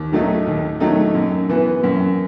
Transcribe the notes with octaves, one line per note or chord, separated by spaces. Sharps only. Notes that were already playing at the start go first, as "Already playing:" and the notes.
Already playing: D#2
D#3 F#3 A3 D#4
D#2
D#3 F#3 A3 D#4
F#2
E3 B3
F#2